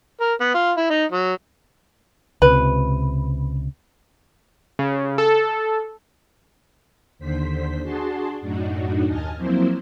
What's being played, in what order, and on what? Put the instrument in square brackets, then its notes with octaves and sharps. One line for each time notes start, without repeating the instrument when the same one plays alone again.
[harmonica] A#4
B3
F4
E4
D#4
F#3
[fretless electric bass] C#2 C3 [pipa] B4
[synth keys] C#3
A4
[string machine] D#2 D3 C5 B6
D4 F#4 G#4 A5 C6
F#2 A2 D4 D#4 F#4
D#2 D#5 G#5 A5 F6
F3 F#3 A#3 C4 E4 C5